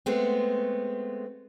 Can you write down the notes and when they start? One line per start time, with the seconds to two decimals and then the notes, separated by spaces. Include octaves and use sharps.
0.06 G#3 A3 B3 C4